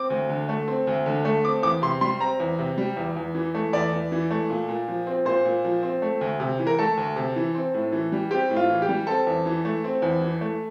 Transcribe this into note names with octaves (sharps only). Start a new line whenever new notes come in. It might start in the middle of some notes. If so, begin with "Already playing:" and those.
Already playing: C4 D6
D2
D3
A3
C4
D2
D3
A3
C4 D6
E2 D6
C3 C6
G3 C6
C4 A#5
E2
C3
G3
E2
E2
E3
A3
E2 D5
E2
E3
A3
A#2
A#2
F3
C4
A#2 C5
A#2
F3
C4
A3
D2
C3
E3
A#4
A3 A4
D2
C3
E3
C4
A2
E3
G3
C4 G4
A2
F4
E3
G4
G3
C4 A4
E2
E3
A3
C4
E2
E3
A3